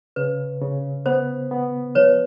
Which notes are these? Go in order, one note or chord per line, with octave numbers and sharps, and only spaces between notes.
C#3 B4
C#3
B3 C5
B3
F3 B4 C#5